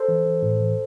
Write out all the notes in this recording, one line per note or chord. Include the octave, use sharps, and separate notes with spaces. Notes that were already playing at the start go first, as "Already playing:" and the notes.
Already playing: A4 C5
E3
E3
A2
E3